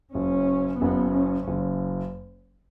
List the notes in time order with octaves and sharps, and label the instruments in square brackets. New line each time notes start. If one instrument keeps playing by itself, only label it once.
[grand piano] F#1 F#2 C#3 [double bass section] C#4
[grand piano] F#1 F#2 C#3 [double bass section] B3
[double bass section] C#4
[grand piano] F#1 F#2 C#3